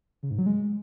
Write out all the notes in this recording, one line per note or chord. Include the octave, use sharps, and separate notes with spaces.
C#3
G#2
F#3
G#3